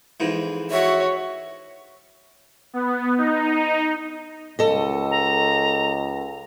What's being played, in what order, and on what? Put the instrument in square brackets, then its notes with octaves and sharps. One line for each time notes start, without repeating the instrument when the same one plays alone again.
[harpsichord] F2 G#2 E3
[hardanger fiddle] F#4 C#5 [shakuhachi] E5
[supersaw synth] B3
D#4
[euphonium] C#2 [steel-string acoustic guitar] A4 D#5
[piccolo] A#5